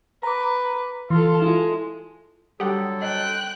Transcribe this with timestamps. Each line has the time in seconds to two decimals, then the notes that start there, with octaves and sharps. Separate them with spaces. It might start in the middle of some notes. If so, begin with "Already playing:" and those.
0.23 B4 A#5 D6
1.10 E3 F4 A4 C6
1.42 G#3 E4 F4
2.60 D3 F#3 G3 G4 A4 F#5
3.02 D#5 G5 F#6